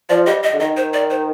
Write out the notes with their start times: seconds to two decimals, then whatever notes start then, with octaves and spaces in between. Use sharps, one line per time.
0.10 F3 D5
0.27 G3 D#5
0.43 D#5
0.54 D3
0.60 D#3 D#5
0.77 C5
0.93 D5
1.10 C5